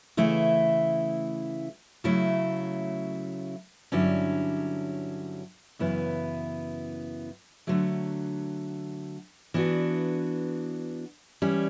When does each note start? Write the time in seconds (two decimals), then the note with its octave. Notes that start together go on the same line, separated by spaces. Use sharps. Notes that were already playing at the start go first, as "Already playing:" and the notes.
0.17 C#3 E3 A3 E4
2.04 C#3 F#3 A3 E4
3.92 G2 D3 F#3 C#4 E4
5.79 F#2 C#3 E3 B3 E4
7.67 D3 F#3 A3
9.54 E3 B3 D4 F#4
11.42 E3 G3 C#4